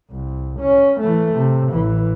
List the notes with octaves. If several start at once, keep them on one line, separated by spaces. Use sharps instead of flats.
C2
C#4
E3 A3
C3
A1 E3